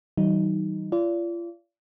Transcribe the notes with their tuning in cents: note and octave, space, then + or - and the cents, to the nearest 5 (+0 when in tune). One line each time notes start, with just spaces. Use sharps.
D#3 +40 F#3 +45 D#4 +0
F4 -35 D5 -30